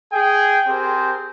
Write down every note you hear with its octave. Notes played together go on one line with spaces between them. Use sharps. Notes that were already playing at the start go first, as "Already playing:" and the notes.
G#4 G5
C4 G4 G#4 A#4 C5